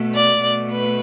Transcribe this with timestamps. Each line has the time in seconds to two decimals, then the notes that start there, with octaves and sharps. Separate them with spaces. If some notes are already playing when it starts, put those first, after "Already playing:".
Already playing: B2 A3
0.15 D5
0.43 B2 A3
0.72 B4